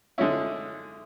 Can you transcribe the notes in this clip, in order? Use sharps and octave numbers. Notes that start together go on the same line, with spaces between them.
D3 G#3 C#4 E4